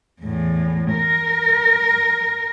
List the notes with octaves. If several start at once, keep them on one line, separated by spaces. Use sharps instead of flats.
E2 A2
A#4